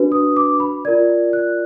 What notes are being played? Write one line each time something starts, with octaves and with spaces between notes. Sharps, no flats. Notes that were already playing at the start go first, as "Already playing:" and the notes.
Already playing: D4 F#4 B4
D#6
D6
B5
F4 A#4 D5 G#6
F#6